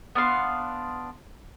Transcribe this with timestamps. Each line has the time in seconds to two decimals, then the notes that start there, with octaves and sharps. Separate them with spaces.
0.15 B3 D4 F5 C6